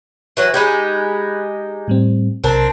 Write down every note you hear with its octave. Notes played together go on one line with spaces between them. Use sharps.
E3 F#3 F#5
G#3 D#4 G4 B5 F#6 G#6
A2 G3 C4
B1 C3 C4 D4 A#4